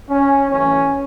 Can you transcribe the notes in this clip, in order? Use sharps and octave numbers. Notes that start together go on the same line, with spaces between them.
C#4
F#2 E3 A3 C#4